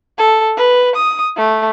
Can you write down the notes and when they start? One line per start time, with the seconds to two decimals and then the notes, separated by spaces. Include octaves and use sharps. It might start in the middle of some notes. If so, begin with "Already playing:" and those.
0.18 A4
0.57 B4
0.96 D#6
1.37 A3